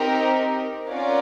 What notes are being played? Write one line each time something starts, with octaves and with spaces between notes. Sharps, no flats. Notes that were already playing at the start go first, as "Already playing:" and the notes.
Already playing: C4 D#4 G4 A#4
C#4 F4 A#4 D5 F#5